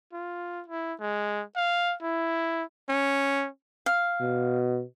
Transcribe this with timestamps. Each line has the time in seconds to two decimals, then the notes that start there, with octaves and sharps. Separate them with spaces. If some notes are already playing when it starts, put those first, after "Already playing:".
0.13 F4
0.68 E4
1.00 G#3
1.56 F5
2.03 E4
2.89 C#4
3.86 F5
4.21 B2